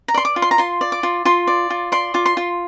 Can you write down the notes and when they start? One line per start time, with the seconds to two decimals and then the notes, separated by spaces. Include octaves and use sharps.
0.08 A#5
0.14 D5 C6
0.25 D6
0.36 F4
0.42 C6
0.51 A#5
0.58 F4 C6
0.81 D5
0.92 D6
1.03 F4
1.25 F4 C6
1.47 D5
1.70 F4
1.92 D5 C6
2.14 F4 D6
2.26 C6
2.37 F4